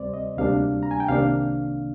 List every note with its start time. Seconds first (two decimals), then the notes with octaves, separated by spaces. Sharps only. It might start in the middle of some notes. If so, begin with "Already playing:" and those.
Already playing: D2 C3 G3 C4 C5 D5
0.14 D#5
0.38 D2 C3 G3 A#3 D4 F5
0.83 A#5
0.91 G#5
1.00 G5
1.09 C2 C3 D#3 A#3 D4 F5